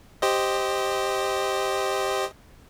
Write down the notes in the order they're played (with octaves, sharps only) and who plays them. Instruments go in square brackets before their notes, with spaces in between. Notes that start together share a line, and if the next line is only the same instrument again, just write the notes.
[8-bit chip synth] G4 C5 D#5